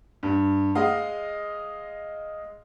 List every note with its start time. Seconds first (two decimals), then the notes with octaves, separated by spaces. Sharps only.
0.23 G2
0.75 G#3 D#5 F5